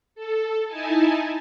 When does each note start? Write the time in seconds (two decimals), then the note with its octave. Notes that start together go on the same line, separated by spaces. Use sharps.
0.15 A4
0.67 D#4 E4 G#5 A5